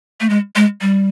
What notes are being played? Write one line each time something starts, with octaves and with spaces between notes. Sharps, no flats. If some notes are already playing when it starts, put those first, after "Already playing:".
A3
G#3
G#3
G3